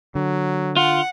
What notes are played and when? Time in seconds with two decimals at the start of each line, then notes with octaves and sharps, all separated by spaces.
0.15 D3 F#3
0.77 F4 F#5